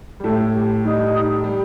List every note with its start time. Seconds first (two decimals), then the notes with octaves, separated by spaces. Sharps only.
0.20 G3
0.24 A2 A3 A4
0.54 G4
0.84 G3 D#4
1.44 G3